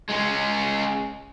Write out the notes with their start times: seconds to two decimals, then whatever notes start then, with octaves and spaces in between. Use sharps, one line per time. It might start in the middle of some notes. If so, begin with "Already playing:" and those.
0.09 G#3 C#4